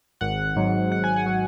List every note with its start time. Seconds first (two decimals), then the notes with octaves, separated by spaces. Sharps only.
0.21 G#1 F#5
0.56 G#2 F#3
0.92 G#1 F#5
1.04 G#5
1.16 F#5
1.26 F#3